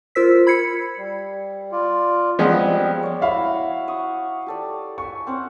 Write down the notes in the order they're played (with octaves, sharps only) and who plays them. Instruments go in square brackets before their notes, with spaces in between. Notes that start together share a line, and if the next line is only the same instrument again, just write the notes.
[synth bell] F4 A#4 C5 E6 B6
B5 G#6 C7 C#7
[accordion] G3
F4 D5
[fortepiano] F3 G#3 B3 [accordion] G3 C4
[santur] C#5 D5
[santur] E4 F#4 C#5 [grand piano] E5 F5 B5
[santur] F#5 C#6 D#6
G4 A4 D5
[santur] E5 G#5 [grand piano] C#6
[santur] C4 C#4 F#5